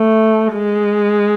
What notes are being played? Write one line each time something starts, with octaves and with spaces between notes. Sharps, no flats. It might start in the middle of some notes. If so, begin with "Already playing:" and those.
Already playing: A3
G#3